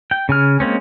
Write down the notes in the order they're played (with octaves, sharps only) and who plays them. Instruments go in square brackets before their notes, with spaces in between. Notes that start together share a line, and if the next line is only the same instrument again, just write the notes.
[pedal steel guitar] G5
C#3 G#5 F6
G#3 A#3 C4 C#4